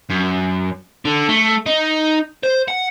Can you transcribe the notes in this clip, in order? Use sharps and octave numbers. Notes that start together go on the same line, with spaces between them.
F#2
D3
A3
D#4
C5
F#5